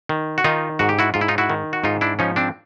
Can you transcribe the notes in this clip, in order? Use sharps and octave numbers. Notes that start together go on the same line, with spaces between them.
D#3
F#4
D#3 D#4 F4
G#2 F#4
G4
E4 F#4
G#2 F4
E4
D#4 F4
E4 F#4
D#3
F#4
G#2 D#4 F4
D4 E4
F3 C#4 D#4
C4 D4